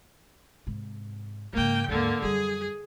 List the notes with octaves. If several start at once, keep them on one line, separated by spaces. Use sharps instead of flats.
G#2 C3
G#2 C#3 A#3 G5
D#2 G#2 D3 A#3
F#2 G3 G#4